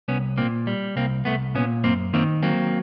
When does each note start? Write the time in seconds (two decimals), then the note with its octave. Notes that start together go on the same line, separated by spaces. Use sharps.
0.08 C2 B3 C#4
0.38 A#2 A#3 C4
0.67 G3
0.96 C2 A#3 C4
1.25 C2 A3 B3
1.55 A#2 B3 C#4
1.84 F#2 A#3 C4
2.13 D#3 A#3 C4
2.43 F#3 A#3 C4